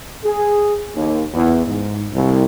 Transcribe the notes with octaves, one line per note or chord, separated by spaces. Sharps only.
G#4
D#2
E2
G#2
C2